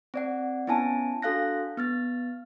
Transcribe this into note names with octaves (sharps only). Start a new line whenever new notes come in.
C4 D5 F#5
B3 C#4 E4 G#5 A5
D4 F#4 A4 F5 F#6 A#6
B3 F6 A6